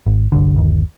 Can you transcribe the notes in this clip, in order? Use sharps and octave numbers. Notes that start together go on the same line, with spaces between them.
G#1
G1 C2 D3
G1 D#2